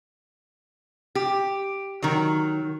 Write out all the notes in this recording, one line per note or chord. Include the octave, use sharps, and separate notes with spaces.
G4
D#3 F#3